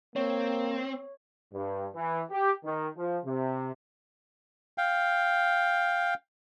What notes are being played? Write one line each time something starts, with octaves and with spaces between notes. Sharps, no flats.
A#3 C4 C#5
G2
E3
G4
D#3
F3
C3
F5 G5